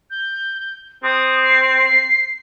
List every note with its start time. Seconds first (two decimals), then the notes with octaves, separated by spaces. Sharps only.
0.10 G6
1.03 C4 D#6
1.43 C7